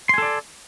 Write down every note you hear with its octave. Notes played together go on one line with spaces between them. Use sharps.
A4 D5 G#5 C6